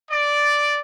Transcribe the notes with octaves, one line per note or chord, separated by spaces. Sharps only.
D5